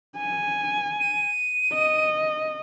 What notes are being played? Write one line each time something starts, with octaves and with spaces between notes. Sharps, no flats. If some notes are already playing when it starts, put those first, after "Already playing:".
G#5
D#7
D#5